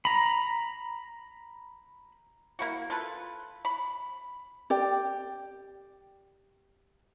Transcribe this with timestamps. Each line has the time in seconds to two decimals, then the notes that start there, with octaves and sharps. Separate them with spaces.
0.05 A#5 B5
2.59 A#3 E4 F#4
2.90 F4 A4 B4
3.65 B5
4.70 G4 D5 G5